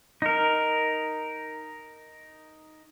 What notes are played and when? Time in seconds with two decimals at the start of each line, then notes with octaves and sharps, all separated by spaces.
0.22 D#4 A#4